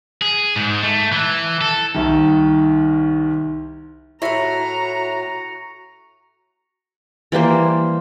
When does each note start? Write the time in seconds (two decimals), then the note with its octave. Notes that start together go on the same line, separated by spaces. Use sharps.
0.22 G#4
0.56 G#2
0.82 A3
1.12 E3
1.61 A4
1.94 C2 D#3
4.22 A2 C3 E4 F#4 A#5 C#6 A#6 C#7
7.32 E3 G3 A#3 C5